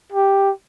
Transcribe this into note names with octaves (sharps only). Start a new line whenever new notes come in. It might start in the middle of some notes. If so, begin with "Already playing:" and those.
G4